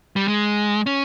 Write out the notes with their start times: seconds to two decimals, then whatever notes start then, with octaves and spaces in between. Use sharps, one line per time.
0.16 G3
0.28 G#3
0.86 C#4